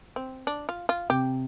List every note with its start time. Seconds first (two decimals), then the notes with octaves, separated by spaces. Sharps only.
0.16 C4
0.47 D4
0.69 F4
0.89 F4
1.09 C3 G4